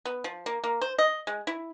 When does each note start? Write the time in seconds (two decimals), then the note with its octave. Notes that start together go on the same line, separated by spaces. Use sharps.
0.05 B3
0.24 F3
0.46 A#3
0.64 A#3
0.81 C5
0.98 D#5
1.27 G#3
1.47 E4